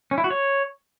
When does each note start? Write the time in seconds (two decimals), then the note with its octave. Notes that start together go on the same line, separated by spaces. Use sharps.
0.11 C#4
0.18 E4
0.24 F#4
0.30 C#5